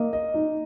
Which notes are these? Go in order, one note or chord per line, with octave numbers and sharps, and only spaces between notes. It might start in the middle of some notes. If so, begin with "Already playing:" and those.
Already playing: A#3 D#5
D#5
D#4